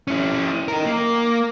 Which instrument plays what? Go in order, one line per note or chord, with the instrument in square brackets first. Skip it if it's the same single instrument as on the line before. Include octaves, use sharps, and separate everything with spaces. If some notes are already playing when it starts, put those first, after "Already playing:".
[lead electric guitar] C#4 E4
D#4 A#4
A#3